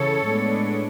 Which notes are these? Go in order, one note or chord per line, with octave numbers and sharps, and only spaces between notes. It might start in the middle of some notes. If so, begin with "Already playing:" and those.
Already playing: C#3 E3 A4 C#5
A2 G#3 B3 D4